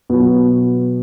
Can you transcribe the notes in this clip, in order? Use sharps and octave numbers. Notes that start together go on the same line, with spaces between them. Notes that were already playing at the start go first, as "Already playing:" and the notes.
B2 F#3 B3